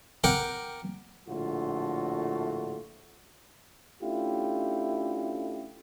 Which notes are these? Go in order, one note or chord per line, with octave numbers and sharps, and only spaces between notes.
A#4 F#5 G5 D6
A#1 A2 D3 A3 F4 F#4
A3 C#4 D4 E4 F4 G4